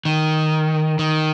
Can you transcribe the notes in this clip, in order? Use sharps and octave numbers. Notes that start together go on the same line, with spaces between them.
D#3
D#3